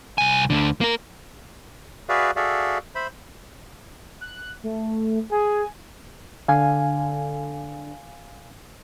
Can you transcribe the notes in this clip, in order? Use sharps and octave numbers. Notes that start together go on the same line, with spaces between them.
C2 G#5
D2 D3
A#3 A#4
F#4 G#4 B4 D5 E5 F5
F#4 G#4 A4 D5 E5 F5
C5 E5 B5
F#6
A3
G#4 G#5
D3 F5 G#5